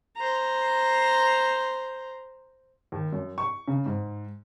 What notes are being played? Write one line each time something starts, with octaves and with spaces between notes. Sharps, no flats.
C5 A#5
D#2
F#2
C#6
C#3
G#2